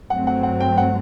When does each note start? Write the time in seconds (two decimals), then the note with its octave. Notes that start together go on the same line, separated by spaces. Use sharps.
0.10 G2 F#3 A3 C4 F#5
0.27 F#5
0.43 F#5
0.60 G5
0.78 F#5